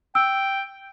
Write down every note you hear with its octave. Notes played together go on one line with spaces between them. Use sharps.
G5 E6